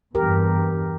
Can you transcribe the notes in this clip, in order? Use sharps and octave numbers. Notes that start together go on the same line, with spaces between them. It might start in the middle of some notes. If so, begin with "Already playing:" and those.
E2 G2 G4 A#4